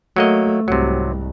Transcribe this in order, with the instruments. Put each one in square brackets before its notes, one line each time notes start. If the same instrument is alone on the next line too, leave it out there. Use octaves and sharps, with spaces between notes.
[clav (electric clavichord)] F#3 A#3 D#5 [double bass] A3
[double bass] C2 G#2 [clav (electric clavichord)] C3 F#3